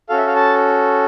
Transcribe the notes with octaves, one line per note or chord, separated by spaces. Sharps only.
C#4 F#4 A4 F5
E5
F5
A5